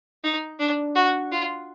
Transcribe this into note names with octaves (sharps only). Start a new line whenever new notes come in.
D#4
D4
F#4
F4